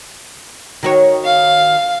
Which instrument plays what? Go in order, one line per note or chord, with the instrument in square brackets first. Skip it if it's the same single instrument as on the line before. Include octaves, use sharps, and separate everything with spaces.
[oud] D#3 F#4 C#5
[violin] F5